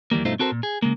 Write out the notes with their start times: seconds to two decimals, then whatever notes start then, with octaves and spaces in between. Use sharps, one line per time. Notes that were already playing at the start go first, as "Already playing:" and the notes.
0.11 D#2 E3 G3 A#3
0.25 G2 B2 A3 D#4 F4 C5
0.39 C4 F#4 A4 A#4 C5
0.52 A#2
0.63 G#4
0.82 C#3 G#3 A#3